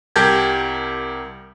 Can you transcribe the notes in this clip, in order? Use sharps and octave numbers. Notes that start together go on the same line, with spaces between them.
C2 G4 A#4 A5 G6 G#6